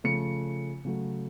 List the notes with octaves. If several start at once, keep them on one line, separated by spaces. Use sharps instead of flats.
C#3 F3 A3 C#7
C#3 F#3 A3